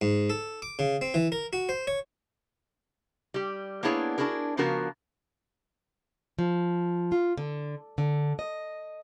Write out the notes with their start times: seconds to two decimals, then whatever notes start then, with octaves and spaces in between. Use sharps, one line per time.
0.01 G#2
0.30 A4
0.62 D6
0.79 C#3
1.01 C4
1.14 E3
1.32 A#4
1.53 F#4
1.69 C5
1.87 C#5
3.34 G3 G4
3.83 A#3 B3 D4 E4 G#4 C#5
4.18 D4 E4 F#4 G#4 A#4
4.57 C#3 F3 B3 D4 F#4 A#4
6.39 F3
7.12 F4
7.38 D3
7.98 D3
8.39 D#5